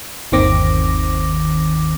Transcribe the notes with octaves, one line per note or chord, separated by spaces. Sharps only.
G1 D#2 D#3 C4 D6 A#6